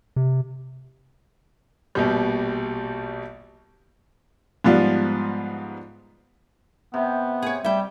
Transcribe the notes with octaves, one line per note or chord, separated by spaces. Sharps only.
C3
A#1 B2 G3
G#2 F3 G3 B3 F4
C3 B3
G#4 C#5
G3 E5 G5